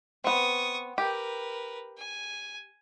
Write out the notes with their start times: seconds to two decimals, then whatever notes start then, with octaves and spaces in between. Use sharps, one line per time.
0.24 B3 C4 C#6 D#6
0.98 G4 A#4 B4
1.98 G#5